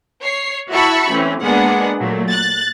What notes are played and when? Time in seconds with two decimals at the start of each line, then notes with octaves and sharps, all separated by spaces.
0.22 C#5 C7
0.71 E4 F#4 E5 A5 B5 C#6
1.12 E3 A3 C4 C#4
1.42 G#3 A#3 B3 D4 G#4 F#5
1.99 A#2 F#3 A3
2.31 F#6 A6